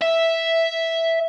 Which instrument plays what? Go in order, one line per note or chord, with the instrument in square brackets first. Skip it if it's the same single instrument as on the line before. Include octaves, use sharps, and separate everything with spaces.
[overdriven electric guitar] E5